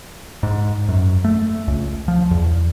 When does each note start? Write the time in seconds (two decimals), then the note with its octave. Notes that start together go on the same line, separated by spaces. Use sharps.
0.43 G#2
0.89 F#2
1.24 A3
1.68 C#2
2.08 F3
2.31 E2